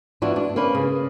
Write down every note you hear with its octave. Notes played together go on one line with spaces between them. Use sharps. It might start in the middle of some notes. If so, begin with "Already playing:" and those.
E3 B3 D4 F4 F#4
D4
A#3 C#4 B4
C#3